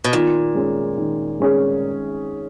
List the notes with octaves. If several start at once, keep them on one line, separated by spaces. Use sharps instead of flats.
B2
A#2 D#3
G#3 C#4 G#4
D#3
G#3 C#4 G#4